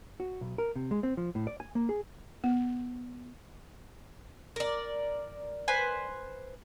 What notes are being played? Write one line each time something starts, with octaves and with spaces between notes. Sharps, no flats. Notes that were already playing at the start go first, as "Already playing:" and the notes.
F#4
B1
A#4
C3
G#3
C4
F3
A2
D5
G#5
A#3
G#4
B3
A#4 D5
B4 C5 G#5